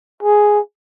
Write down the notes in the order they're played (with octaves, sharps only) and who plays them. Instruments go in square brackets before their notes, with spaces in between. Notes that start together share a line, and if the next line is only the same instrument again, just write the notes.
[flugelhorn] G#4